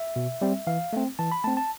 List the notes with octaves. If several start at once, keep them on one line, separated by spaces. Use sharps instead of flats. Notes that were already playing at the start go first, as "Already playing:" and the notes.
Already playing: E5
B2
G3 C4
E3 F5
A3 C4
E3 A5
B5
A3 C4 A5
A5